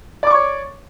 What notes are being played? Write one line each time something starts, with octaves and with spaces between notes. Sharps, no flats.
C#5 D5 C#6 D6